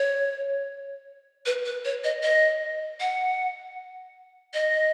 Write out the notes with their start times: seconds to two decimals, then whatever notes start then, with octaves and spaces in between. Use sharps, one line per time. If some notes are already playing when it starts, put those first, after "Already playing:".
Already playing: C#5
1.46 B4
1.65 B4
1.85 C#5
2.04 D#5
2.23 D#5
3.00 F#5
4.54 D#5